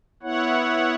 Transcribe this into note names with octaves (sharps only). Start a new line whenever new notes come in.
B3 E4 C#5 F#5